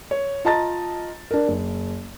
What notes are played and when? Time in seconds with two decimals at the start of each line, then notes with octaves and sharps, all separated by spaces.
0.11 C#5
0.45 F4 D#5 A5 A#5 A6
1.31 D4 A#4
1.48 F#1